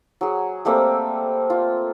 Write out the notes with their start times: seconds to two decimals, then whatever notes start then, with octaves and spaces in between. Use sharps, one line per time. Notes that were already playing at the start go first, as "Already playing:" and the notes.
0.21 F#3 G#4
0.65 G3 A3 A#3 C4
1.50 F4